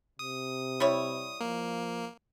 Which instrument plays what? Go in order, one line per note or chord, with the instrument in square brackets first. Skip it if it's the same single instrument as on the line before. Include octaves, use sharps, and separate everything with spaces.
[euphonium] C3 [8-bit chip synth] D#6
[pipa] G3 E4 C#5
[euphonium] F3 [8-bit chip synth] A#3